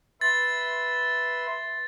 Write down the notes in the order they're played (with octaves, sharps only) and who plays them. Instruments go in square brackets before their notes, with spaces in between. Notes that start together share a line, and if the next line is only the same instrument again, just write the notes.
[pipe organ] B4 E5 C6 [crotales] A6